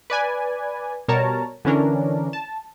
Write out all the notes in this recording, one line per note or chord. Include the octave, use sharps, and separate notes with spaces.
B4 D5 G#5
B2 G3 A#4 C#5 A5 A#5
D3 E3 C#4 D4 A#4
A5